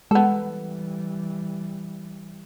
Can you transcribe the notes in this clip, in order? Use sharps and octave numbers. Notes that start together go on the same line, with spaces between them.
E3 G3 G#3 B3 A4